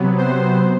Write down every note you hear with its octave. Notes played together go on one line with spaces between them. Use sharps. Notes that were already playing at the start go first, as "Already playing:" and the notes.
Already playing: C3 F#3 B3
C5